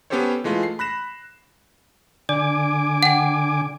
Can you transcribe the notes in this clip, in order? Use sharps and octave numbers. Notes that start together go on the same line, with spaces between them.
B3 C#4 G4 A4 C5 C#5
E3 G#3 A3 F4
C7
B5 F#6 A#6 E7
D3 D5 G#5 D6
F#5 G5